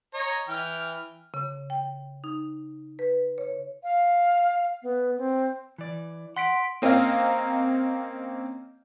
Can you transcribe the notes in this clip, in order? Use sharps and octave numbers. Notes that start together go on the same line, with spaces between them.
C#5 D#5 A#5
E3 G5 F6
C#3
G5
D#4
B4
C#5
F5
B3
C4
E3 D5
F#5 C6 B6 D7
A#3 C4 C#4 D#5 F5